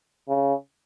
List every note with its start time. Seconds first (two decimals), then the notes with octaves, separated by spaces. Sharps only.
0.29 C#3